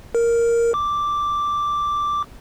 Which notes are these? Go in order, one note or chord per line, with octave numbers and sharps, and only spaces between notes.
A#4
D6